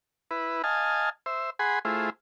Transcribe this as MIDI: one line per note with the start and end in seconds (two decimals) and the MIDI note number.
0.31 0.62 64
0.31 0.62 71
0.64 1.10 75
0.64 1.10 77
0.64 1.10 80
0.64 1.10 81
1.26 1.50 72
1.26 1.50 76
1.59 1.79 68
1.59 1.79 78
1.59 1.79 80
1.59 1.79 83
1.59 1.79 84
1.85 2.10 57
1.85 2.10 64
1.85 2.10 65
1.85 2.10 68
1.85 2.10 72